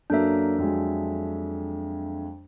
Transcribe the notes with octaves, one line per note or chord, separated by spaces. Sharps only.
F#2 F#3 A#3 D4 A4 E5
F2 F#3 G#3